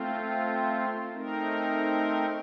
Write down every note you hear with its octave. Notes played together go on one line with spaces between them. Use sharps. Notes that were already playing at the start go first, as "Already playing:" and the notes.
Already playing: A3 C4 F4
A3 C4 D#4 A#4